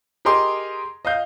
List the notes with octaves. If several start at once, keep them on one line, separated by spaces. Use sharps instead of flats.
G4 G#4 A#4 D#5 C6 D6
D#5 F5 G6